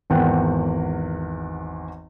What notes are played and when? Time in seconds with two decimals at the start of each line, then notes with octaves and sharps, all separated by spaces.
0.10 G#1 E2 F#5 G5